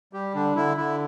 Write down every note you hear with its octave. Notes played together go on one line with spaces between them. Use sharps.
G3 G4
D3 D4
D3 E4
D3 E4